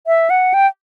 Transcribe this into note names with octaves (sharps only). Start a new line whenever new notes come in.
E5
F#5
G5